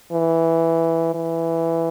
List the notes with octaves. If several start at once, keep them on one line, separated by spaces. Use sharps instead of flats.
E3
E3